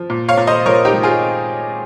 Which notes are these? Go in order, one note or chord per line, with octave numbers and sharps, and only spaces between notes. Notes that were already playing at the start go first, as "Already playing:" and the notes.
Already playing: F3
A#2
C#5 F5
A#2
C5 D#5
F3 A#4 C#5
D#4 G4
F3
F4 G#4